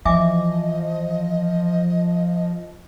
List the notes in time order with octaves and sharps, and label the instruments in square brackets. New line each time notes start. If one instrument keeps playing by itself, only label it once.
[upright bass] E3 [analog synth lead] F3 [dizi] D#5 [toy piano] E5 G#5 D6